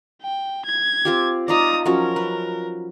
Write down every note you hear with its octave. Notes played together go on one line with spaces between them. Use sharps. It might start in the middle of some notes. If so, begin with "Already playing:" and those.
G5
G#6
C4 F4 G4
D#4 F4 D5 A#5 D#6
F3 F#3 C#4 A#4
B4